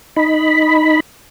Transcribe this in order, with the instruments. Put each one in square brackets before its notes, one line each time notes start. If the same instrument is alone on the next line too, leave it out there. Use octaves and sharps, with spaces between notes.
[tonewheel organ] D#4 B5